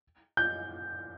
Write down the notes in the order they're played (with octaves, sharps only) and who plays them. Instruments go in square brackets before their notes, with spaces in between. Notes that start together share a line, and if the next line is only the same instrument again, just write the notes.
[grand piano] G6